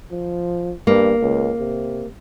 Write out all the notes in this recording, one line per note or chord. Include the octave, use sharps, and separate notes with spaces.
F3
G2 A#3
C#2
C3